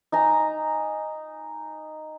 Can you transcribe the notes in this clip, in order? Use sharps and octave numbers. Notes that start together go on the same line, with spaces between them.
D#4 G#5 A#5